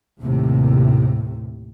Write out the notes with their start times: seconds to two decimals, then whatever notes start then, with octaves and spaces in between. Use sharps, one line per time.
0.19 D#2 A2 C3